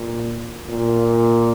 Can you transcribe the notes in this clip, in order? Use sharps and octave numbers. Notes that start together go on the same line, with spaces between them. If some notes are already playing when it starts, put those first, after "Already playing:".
Already playing: A#2
A#2